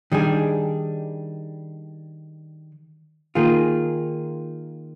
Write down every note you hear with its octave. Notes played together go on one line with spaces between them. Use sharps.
D#3 G3 D4 G#4
D#3 A#3 F4 G#4